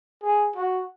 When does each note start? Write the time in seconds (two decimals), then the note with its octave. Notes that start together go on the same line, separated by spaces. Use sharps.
0.23 G#4
0.56 F#4